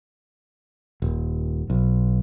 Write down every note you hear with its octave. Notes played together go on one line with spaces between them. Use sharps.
D#1
B1